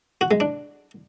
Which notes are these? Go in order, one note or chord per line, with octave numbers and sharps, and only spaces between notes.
F#4
G#3
D4